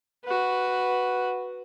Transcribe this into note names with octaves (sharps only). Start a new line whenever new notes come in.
F#4 B4